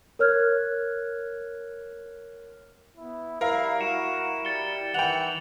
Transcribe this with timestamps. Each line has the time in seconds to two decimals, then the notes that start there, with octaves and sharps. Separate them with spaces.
0.19 A#4 C#5 F6 F#6 G#6
2.97 B3 E4
3.41 G3 E4 A#4 F5
3.80 E4 F#4 C#7 D7 E7
4.45 G3 A6 C#7 G7
4.94 D#3 E3 F#5 G5 C#7 F7 F#7